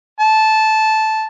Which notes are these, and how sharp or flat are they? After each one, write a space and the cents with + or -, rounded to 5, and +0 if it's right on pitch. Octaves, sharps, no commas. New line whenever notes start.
A5 -10